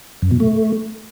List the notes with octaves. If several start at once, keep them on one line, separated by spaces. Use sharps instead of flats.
F#2
B2
A3